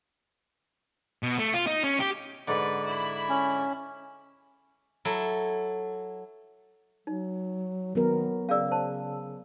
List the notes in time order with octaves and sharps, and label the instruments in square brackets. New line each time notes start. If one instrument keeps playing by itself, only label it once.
[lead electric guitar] B2
A3
F4
D#4
C#4
G4
[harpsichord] G#2 D3 [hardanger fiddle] B4
[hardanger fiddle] E4 B5
[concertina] C#4
[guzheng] F#3 E4 A4
[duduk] F#3 [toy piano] D#4
[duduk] D#3 [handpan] F#3 B3 A#4
[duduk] C#3 [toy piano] C#4 G#4 D5 [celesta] F5 E6
[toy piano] C5 A5